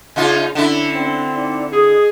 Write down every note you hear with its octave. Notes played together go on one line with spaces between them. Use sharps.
C#3 D#4 F4 E5 G#6
D3 C#4 D4 E4
C4
D#4 D5 D6
G#4 D#5 D#6